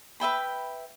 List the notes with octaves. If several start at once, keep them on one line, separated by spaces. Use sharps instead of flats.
B4 E5 G5 B5